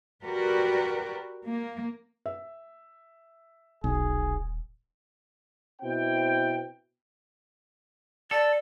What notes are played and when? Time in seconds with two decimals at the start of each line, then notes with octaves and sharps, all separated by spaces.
0.23 F#4 G4 A#4 B4 D5
1.45 A#3
2.26 E5
3.84 D#1 B1 G#4
5.82 B2 C4 E4 G5
8.31 A4 D5